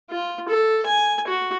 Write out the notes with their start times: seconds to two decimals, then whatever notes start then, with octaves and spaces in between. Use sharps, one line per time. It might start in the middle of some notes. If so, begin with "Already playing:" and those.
0.11 F4
0.49 A4
0.86 G#5
1.28 F#4